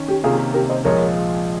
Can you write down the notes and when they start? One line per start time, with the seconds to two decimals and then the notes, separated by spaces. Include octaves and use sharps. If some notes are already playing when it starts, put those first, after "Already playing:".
Already playing: D#3 C#4
0.08 G4
0.24 C3 D#3 A#3 C#4 F4 G#4
0.54 G4 A#4
0.69 C5 D#5
0.85 A#1 A#2 F3 G#3 A#4 C#5